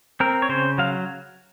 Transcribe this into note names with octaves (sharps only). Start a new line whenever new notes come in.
C4 A#4
C#5
C#3 C5
F#3 F5